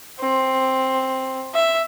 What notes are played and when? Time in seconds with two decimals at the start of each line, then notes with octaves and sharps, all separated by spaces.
0.20 C4
1.55 E5